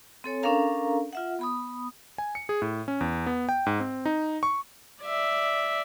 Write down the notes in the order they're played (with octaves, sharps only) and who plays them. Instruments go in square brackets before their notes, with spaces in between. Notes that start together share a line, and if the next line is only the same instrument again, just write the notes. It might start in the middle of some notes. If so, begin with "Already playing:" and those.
[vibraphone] C4 A4 C#5 G#5
C#4 D4 A4 A#4 F5 A#5
F4 E5 F#5
B3 B5 D#6
[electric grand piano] G#5
C#7
G#4
A2
C#4
E2
B3
G5
G#2
C4
D#4
C#6
[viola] D5 E5